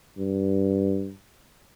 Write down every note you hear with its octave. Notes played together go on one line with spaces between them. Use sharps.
G2